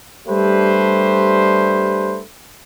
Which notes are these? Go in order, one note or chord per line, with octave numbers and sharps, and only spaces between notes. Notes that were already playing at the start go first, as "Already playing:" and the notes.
G3 A3 D4 G4 B4 C5